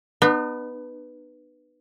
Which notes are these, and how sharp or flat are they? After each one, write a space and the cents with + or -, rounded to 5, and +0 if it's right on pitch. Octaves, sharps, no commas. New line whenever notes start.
B3 +0 D#4 -45